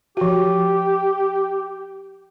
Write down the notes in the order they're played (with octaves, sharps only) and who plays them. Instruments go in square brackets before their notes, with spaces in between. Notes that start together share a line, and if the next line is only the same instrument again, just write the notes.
[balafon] F3 F#4 [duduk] G4